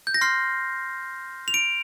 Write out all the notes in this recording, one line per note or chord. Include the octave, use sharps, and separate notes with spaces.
G6
A#6
C6 F6 C7
F7
D7